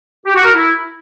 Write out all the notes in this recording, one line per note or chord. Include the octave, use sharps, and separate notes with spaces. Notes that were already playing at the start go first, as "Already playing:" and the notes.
G4
F#4
A#4
E4